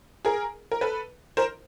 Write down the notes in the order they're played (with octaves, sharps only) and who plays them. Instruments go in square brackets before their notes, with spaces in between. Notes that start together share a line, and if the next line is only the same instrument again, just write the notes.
[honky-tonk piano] G#4 A#4
A#4
A4 B4
A#4 C5